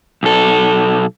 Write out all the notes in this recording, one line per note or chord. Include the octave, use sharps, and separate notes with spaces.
B1 A4